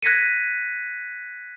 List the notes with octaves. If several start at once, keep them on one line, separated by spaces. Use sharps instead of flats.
F#6 G#6 A#6 B6 C#7 D#7